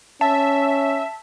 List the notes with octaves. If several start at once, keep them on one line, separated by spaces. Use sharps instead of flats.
C#4 E5 A5